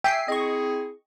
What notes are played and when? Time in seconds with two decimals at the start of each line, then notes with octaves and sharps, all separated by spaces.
0.04 E5 G5 G#5 C7
0.28 C4 E4 G#4 D#5 C#6